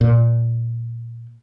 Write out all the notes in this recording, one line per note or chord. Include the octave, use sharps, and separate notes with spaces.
A#2